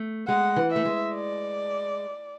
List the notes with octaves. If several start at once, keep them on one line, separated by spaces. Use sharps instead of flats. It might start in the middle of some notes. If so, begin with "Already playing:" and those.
Already playing: A3
G#3 F#5
E3
E5
A3
G#3
D5